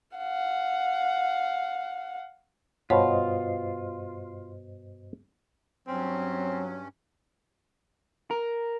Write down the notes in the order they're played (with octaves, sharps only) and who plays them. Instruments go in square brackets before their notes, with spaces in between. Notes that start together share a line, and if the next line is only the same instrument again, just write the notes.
[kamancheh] F5 F#5
[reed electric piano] G2 C5 D#5 [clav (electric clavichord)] B2 [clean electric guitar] F4 [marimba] C#5
[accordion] G2 C#4 [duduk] F#3 [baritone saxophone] C4
[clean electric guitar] A#4